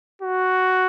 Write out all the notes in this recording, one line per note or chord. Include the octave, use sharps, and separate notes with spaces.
F#4